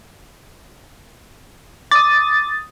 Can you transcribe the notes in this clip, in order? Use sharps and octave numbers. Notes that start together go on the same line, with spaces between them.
D6 D#6 A6